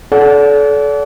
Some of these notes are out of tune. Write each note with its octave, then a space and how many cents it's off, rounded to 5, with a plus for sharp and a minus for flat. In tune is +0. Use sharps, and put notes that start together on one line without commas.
A4 -30 D5 -40 F#5 +0